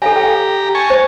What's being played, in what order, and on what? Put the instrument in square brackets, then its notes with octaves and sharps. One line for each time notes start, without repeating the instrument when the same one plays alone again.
[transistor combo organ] G4 A#5 [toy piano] A4 F5 G#5
[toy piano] G5
[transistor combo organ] G#5 A5 C#6
[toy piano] C5